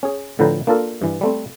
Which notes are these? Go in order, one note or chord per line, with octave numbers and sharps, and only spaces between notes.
C#4 G#4
A2 D3 F3 B4 G5 A#5
A#3 D4 F4 A4 A#4
G2 E3
G3 A3 C4